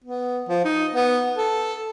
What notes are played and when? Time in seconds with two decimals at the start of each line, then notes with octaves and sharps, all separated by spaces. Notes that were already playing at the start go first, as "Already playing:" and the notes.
0.04 B3
0.49 F3
0.65 D#4
0.95 B3
1.38 A4